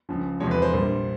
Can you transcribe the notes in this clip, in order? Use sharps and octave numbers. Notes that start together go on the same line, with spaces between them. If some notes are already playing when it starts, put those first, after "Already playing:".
C#2 C#3 F3
E2 C3 F3 G#3 C#5
B4
C5
A#1 A#2 G3 A#3